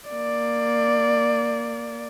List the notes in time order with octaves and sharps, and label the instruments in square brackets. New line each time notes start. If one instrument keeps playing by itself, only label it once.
[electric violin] A#3 D5